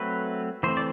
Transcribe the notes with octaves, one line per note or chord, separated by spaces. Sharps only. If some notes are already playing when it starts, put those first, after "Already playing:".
Already playing: F#3 A3 C4 B4
E3 A3 C4 C5
D5